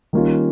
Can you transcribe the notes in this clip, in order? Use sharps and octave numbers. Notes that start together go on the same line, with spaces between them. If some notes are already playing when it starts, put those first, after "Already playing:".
D#3 G3 A#3 C#4 F4